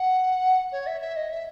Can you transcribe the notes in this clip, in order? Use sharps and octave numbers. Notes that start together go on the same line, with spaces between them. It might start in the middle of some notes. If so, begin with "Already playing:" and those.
Already playing: F#5
C#5
E5
E5
D#5
E5